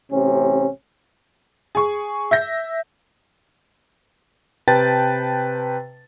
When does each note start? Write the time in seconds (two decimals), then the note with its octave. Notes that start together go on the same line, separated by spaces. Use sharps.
0.11 A1 C3 C#4
1.75 G#4 C#6
2.31 E5 G6 A#6
4.68 C3 B4 G5 A5 A6